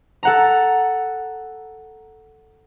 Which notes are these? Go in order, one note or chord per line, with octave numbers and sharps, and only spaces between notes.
A4 F#5 A#5